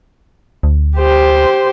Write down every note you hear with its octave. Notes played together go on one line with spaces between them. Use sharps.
D2
G4 C5